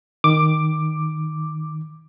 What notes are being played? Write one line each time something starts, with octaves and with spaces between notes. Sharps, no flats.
D#3 D6